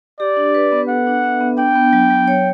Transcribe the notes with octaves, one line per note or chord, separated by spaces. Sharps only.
G4 D5
D4
B4
B3
A4 F#5
D4
E5
B3
D4 G5
B3
F#3
F#3
C#5